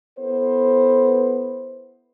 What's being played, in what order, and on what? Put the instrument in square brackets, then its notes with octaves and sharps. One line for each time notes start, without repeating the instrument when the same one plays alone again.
[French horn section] B3 E4 A4 B4 C5